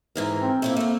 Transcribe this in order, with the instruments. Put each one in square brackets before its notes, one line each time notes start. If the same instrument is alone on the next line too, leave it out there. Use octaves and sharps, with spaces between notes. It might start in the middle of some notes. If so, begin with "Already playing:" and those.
[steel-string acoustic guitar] G#2 E3 A#4
[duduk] C4
[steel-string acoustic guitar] A3 C4 E4 [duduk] A#3
[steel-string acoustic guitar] A3 C4